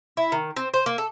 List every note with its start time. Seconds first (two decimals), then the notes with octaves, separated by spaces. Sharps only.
0.17 E4
0.32 D#3
0.57 C4
0.74 C5
0.86 A#3
0.98 A4